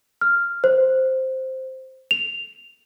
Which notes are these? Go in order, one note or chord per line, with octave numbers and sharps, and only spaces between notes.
F6
C5
F7